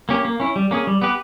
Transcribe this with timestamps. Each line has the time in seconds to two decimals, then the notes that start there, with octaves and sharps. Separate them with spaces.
0.09 A#3 C#4 G4
0.25 A#3
0.40 C#4 E4
0.56 G3
0.71 A#3 C#4 G#4
0.87 G3
1.02 B3 G4 B4